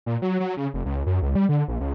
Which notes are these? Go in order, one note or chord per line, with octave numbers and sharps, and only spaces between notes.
A#2
F#3
F#3
C#3
F1
C#2
F#2
C#2
G3
D3
A#1
C#2